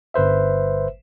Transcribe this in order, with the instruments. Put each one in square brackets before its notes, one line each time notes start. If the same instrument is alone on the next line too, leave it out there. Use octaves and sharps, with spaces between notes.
[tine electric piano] G1 B4 C5 E5